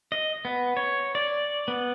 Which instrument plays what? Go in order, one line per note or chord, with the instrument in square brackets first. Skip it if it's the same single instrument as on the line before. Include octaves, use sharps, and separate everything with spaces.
[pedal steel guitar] D#5
B3
C#5
D5
B3